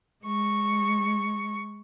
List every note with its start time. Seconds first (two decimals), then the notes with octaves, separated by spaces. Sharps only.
0.25 G#3 C#6